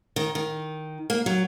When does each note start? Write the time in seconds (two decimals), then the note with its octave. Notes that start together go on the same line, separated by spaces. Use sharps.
0.16 D#3
0.35 D#3
1.10 A#3
1.26 F#3